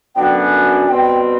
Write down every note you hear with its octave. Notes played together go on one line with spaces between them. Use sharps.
F#2 D3 F#3 B3 D4 G5
G#5
B2 G3 C4 G5
G5